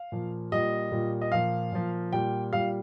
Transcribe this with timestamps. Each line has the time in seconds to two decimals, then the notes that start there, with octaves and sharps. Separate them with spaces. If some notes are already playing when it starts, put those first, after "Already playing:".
Already playing: F5
0.12 A#2 F3
0.52 A#2 G3 D#5
0.92 A#2 G3
1.21 D#5
1.32 A#2 F3 F5
1.72 A#2 F3
2.13 A#2 G3 G5
2.53 A#2 G3 F5